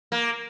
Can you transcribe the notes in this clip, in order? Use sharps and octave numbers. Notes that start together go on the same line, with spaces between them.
A#3